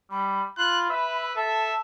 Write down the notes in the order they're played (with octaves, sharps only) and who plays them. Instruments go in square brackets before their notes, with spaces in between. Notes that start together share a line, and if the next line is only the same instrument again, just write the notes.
[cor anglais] G3 [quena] B5
[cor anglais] F4 [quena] B5 [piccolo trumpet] F#6
[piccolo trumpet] B4 [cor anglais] E5
[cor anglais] A4 [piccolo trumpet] E5 [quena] A5